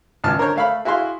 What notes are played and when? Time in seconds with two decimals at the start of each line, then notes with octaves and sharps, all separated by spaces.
0.24 G#1 C#2 G#2 A5 F6
0.38 D3 A#4 C5 C#5
0.56 A3 F5 B5
0.85 E4 F#4 G#4 F5 C6